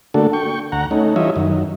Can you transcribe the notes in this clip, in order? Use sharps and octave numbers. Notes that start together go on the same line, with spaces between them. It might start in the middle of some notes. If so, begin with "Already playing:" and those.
D3 A3 A#3 D4 F#4 A4
G5 C#6
D2 F#5 A#5
A3 C#4 D#4
E3 G3 F4 C#5 D#5 E5
F#2 D#3